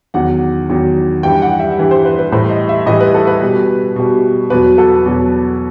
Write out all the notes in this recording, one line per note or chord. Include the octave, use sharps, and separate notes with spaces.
E2 D#3 F#3 F#5
E2 D#3 F#3
G2 E3 G3 G5
F#5
E5
G2 E3 G3
C5
B4
B4
A2 E3 G3 C5
D#5
E5
A2 E3 G3 D#5
B4
A4
B4
B2 G3
B2 G3
E2 B2 F#3 B4
A4
E2 B2 F#3